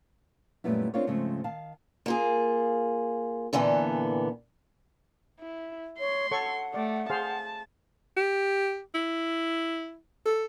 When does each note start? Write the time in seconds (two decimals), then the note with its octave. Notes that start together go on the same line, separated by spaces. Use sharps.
0.64 F#2 A#2 G3 A3 B3 E4
0.94 C4 D4 F4 A#4 C#5
1.07 G#2 C#3 F3 G#3 A3 C4
1.44 D#3 F5 A5
2.06 A#3 F4 G#4
3.53 A#2 D3 E3 B3 A4
5.40 E4
6.00 C#5 C6
6.31 A4 C#5 F#5 C#6
6.74 A3 D5
7.10 G#4 C5 F5 A5
8.16 G4
8.95 E4
10.25 A4